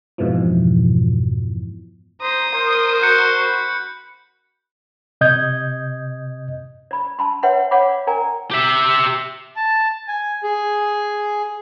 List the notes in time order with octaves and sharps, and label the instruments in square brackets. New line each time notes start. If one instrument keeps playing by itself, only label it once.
[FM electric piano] F2 G#2 B2 E3 F3
[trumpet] C5 [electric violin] A#5 [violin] D#6
[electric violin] A#4 [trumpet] C5
[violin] F#4 [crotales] F#6 G6 C#7
[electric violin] B5
[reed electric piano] C3 D#5 D#6 G6 G#6
[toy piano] D5 B5
A5 B5 C6
B4 C#5 E5 F#5 G5 C6
C#5 D5 F5 F#5 B5 D6
A#4 D5 G5 G#5 A#5
[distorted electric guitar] G4 E5
[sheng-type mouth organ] A5
G#5
G#4